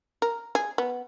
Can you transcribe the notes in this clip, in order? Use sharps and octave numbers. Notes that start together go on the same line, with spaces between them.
A#4
G#4
B3